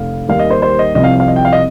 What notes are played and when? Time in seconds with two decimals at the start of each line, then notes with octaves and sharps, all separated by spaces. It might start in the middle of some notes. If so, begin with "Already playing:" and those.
Already playing: F1 F5
0.28 D#2 D#3 G3 F5
0.39 D#5
0.50 C5
0.62 C5
0.79 D#5
0.95 C2 C3 F3 D#5
1.04 F5
1.20 F5
1.28 D#5
1.36 G5
1.45 F5
1.53 D#5